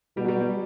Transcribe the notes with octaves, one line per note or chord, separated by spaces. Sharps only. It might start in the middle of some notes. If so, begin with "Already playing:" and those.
B2 G3
F#3
G3
G3